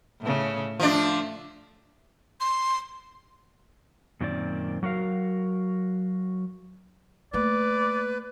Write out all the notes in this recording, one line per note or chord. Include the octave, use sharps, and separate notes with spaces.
A2 C#3
F3 A3 D4
C6
F#2 A#2 D#3 C4 D5
F#3 F#4 A#4 F5
A3 A#3 B4 D5